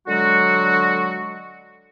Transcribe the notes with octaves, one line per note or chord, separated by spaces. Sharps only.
D3 F#3 G#3 F#4